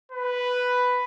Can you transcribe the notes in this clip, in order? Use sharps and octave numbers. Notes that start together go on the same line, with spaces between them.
B4